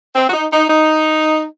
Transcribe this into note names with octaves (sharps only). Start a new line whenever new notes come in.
C4
F#4
D#4
D#4
D#4